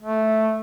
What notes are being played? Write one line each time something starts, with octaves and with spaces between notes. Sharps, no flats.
A3